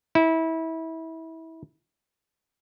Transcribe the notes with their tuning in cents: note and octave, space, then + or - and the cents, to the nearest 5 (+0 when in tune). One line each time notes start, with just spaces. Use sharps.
E4 -25